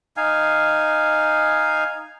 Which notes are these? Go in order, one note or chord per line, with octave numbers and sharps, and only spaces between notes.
D#4 F5 G#5